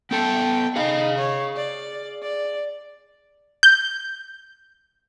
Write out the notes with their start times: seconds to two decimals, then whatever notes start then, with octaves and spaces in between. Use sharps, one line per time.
0.11 B3 A4 G5 A5
0.76 D#4 G#4 F5
1.18 C#5
1.56 D5
2.23 D5
3.63 G6